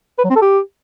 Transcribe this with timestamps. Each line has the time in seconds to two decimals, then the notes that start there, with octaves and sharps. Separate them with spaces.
0.18 B4
0.24 F#3
0.30 C4
0.36 A4
0.42 G4